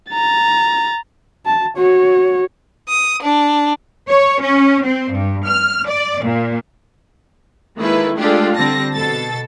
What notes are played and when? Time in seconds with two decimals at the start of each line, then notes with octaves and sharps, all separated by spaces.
0.12 A#5 A6
1.46 A5
1.77 F#4 C#5
2.89 D#6
3.23 D4
4.10 C#5
4.42 C#4
4.85 C4
5.13 G2
5.48 F6
5.88 D5
6.24 A#2
7.78 D#3 G#3 A#3 E4 A4 B4
8.16 G#3 A3 D4 F4 G4 A4
8.57 D3 G3 C4 A5 A#6
8.94 B2 A4 A6